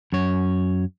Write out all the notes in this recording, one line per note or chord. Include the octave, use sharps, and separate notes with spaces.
F#2 C#5